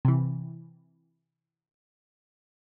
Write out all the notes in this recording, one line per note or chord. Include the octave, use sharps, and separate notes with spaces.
C3 E3